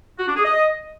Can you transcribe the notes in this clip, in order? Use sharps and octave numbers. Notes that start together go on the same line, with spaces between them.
F#4
D4
G#4
D#5